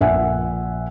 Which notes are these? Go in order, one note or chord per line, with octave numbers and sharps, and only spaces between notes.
A#1 E5 F#5 G#5